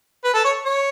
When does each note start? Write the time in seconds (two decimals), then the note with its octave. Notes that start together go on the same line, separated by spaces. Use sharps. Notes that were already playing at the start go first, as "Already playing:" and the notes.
0.24 B4
0.34 A4
0.44 C#5
0.65 C#5